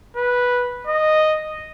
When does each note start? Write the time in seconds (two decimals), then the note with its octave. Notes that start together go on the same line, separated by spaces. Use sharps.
0.16 B4
0.87 D#5